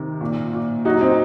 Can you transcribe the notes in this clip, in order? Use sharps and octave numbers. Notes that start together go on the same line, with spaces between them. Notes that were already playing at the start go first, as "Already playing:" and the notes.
Already playing: C3 D#3
A#2
A#2
F#3 D#4 F#4
C4 D#4